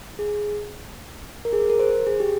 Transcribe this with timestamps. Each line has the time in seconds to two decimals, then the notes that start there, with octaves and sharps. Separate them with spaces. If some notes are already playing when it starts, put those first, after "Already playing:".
0.19 G#4
1.45 A#4
1.53 G#4
1.70 A#4
1.80 C5
2.07 G#4
2.20 G4